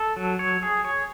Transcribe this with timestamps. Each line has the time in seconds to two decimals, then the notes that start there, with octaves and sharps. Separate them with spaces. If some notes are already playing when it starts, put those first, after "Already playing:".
Already playing: A4
0.16 F#3
0.39 C#5
0.63 G#4
0.85 C#5